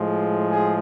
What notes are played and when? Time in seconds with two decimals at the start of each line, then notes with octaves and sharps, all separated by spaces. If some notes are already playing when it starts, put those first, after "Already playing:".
Already playing: A2 F3 G#3
0.50 G#4